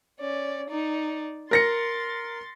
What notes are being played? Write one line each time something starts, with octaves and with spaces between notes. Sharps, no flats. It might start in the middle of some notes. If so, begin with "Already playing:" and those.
C#4 D5
D#4 D5
A#4 C6 A6 A#6 C#7